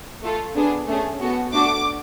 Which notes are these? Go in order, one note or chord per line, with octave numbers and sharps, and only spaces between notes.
A3 F4 A4
B3 D4 G#4
A3 C#4 G#4
B3 F#4 A4
A3 D4 F#4 A4 D6